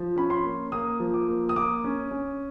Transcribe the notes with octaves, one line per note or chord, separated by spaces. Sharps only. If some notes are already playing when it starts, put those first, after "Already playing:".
Already playing: F3
C#4 B5
C6
A#3
A#3 D#6
F3
D6
A#3
D#6
A#3 D6
C#4
C#4